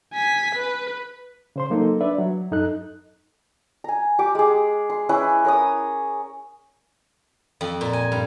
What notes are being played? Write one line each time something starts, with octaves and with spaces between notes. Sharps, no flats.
G#5 B6
B4
C#3 C5 C6
F#3 A#3 D#4 A4
D4 B4 D5 E5
F#3
F#2 D#4 A4 D#5 F#6
G#5 A#5
G4 D6
G#3 G#4
C6
C#4 E4 B4 G#5
A#4 C#5 D#6
F2
A#2
G#5
G2